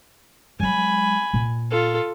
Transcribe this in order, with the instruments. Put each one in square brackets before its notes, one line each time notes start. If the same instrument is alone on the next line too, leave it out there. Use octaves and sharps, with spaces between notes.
[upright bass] F#3 G#3 [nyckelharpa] G#5 B5
[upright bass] A#2
[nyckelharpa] F4 A4